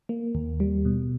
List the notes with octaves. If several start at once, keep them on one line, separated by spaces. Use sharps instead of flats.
A#3
D#2
G3
B2